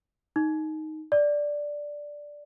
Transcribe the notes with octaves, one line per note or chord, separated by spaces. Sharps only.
D#4
D5